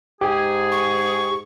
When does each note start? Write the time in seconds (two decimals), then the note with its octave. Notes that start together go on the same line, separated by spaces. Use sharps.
0.21 G#2 G4 G#4
0.72 C#6